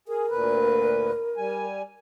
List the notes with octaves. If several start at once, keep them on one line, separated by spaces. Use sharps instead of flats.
G#4 A#4
D2 A#2 B4
G3 G#5